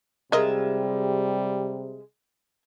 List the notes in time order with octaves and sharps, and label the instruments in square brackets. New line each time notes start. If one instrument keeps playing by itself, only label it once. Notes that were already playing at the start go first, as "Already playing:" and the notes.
[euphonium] C3 [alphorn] G3 [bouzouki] G#3 F4 E5 [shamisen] A#4 D#5